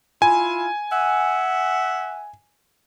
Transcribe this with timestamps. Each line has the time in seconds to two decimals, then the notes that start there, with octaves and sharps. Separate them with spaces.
0.22 E4 F4 G#5
0.91 E5 F#5